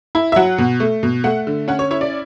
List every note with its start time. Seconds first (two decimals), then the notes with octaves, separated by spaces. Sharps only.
0.15 E4
0.32 E5
0.36 F#3 F#5
0.58 B2
0.80 A3
1.03 B2
1.24 A3 F#5
1.47 D3
1.68 C#4 F#5
1.79 C#5
1.91 E4 C#5
2.01 D5